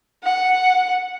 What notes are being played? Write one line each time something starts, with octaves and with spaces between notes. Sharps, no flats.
F#5